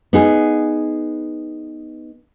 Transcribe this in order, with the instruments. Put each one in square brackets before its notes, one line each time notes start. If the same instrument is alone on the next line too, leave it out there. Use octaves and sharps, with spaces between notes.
[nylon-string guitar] B3 D#4 G#4